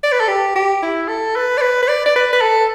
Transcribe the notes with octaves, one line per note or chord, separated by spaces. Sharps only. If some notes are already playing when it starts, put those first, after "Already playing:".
D5
B4
A4
G4
G4
E4
A4
B4
D5
B4
B4
D5
D5
B4
B4
A4